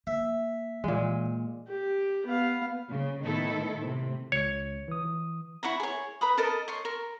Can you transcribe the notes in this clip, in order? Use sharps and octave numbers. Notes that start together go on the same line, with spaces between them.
A#3 E5
A#2 E3 G#3
G4
B3 F5
C#3
A2 D#3 B3 D#4 E4 A4
A2 C3
C#2 C#5
E3 D#6
E4 C#5 F#5 A#5
G#4 C#5
B4 A#5 B5 D#6
A4 A#4 D#5 A5
C#5 C6
A#4